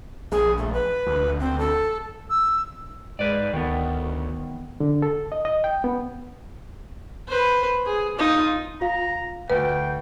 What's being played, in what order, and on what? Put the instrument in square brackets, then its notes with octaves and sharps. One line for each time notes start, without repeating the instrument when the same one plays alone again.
[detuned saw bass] A#1 [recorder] G#4
[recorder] A3
B4
[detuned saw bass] D2
[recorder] C4
A4
[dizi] E6
[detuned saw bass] G#2 [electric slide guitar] B4 D5
[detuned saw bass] D2 [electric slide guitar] D#3 B3
[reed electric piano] D3
A4
D#5
D#5
G5
B3
[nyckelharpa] B4 C5
G#4
D#4 F4
[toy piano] F4 F5 [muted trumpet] A#5
[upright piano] D2 [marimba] B4 [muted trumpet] G5